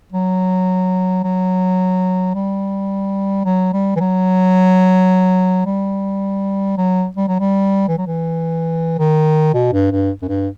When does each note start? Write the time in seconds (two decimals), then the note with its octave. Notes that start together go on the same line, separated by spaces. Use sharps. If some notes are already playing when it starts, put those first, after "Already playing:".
0.12 F#3
1.24 F#3
2.34 G3
3.45 F#3
3.73 G3
3.96 E3
4.00 F#3
5.66 G3
6.77 F#3
7.17 G3
7.28 F#3
7.40 G3
7.88 E3
7.98 F#3
8.07 E3
8.99 D#3
9.54 B2
9.73 G2
9.91 G2
10.22 F#2
10.28 G2